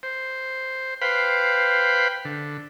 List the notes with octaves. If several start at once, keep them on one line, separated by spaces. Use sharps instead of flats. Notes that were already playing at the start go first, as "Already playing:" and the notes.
C5
B4 C5 F5 G5 B5
D3